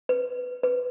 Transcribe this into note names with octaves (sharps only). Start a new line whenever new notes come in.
B4
B4